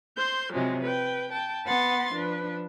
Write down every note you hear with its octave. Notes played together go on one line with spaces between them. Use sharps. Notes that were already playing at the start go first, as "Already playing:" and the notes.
C5 C6 G6
C3 F3 F#3 G#3
B4 G5
G5 A5
B3 F#5 B5 C6 A6
F3 D4 B4